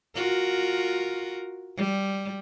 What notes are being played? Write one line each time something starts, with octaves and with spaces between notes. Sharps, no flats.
F4 F#4 A#4
G3